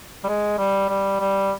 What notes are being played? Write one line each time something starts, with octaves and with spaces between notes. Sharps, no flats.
G3
G#3
G3
G3
G3